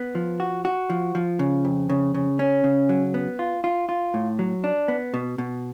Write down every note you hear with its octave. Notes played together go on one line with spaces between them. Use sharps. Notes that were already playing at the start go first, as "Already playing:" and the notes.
Already playing: B3
F3
F#4
F#4
F3
F3
C#3
F2
C#3
C#3
C#4
C#3
F#3
B3
F4
F4
F4
A2
F#3
D4
B3
B2
B2